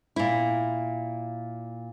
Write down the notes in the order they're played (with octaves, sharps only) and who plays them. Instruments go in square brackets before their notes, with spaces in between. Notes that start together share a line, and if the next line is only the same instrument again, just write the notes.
[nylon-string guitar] A#2 E4